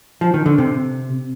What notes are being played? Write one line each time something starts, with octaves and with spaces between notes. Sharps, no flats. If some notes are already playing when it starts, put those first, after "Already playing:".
F3
D#3
D3
C3